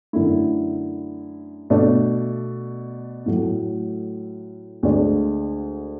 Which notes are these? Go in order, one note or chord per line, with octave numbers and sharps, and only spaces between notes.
F#2 D3 A3 E4
B2 A3 D4
A2 F#3 A3
D2 D3 G#3 D4